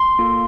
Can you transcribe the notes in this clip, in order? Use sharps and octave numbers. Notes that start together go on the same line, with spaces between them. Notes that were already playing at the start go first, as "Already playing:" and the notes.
Already playing: C6
A#3 F4 A4